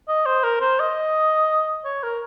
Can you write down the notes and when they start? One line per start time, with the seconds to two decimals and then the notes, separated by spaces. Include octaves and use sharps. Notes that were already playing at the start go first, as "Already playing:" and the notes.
0.08 D#5
0.26 C5
0.43 A#4
0.61 C5
0.79 D#5
1.85 C#5
2.03 A#4